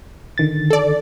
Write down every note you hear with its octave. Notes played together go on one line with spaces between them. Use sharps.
D3 D#3 A6
A4 D5